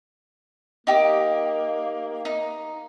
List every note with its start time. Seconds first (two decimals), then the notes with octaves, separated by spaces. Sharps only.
0.87 A#3 D#4 G4
2.25 D#4